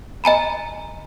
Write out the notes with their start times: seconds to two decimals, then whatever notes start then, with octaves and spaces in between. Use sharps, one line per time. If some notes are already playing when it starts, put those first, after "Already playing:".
0.24 D#5 G#5 A#5 B5